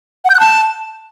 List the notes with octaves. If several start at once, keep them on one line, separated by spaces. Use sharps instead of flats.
F#5
G6
F#6
A5